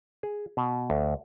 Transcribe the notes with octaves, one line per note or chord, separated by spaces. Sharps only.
G#4
B2
D2